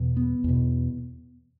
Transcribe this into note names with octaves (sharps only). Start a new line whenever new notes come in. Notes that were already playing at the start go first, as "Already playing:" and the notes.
Already playing: E2 B2
B3
E2 B2